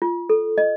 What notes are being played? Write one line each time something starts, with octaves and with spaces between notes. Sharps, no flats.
F4
A4
D#5